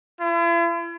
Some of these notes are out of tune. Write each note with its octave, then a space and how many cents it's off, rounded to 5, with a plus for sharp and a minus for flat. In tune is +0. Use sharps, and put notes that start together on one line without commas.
E4 +45